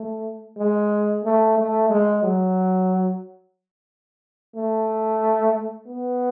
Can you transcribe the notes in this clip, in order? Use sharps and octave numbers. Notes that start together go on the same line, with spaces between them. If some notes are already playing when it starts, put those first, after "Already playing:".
Already playing: A3
G#3
A3
A3
G#3
F#3
A3
B3